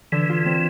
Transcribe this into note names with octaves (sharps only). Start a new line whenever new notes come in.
D3 E3
F4
C4